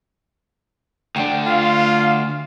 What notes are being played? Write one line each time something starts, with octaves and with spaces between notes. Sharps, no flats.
D2 D4 G5
F4 F5